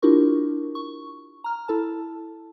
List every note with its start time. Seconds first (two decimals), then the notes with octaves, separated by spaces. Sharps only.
0.02 D4 E4 F4 G4 A#4 C#6
0.75 C#6
1.44 A#5 F6
1.68 E4 A4 A5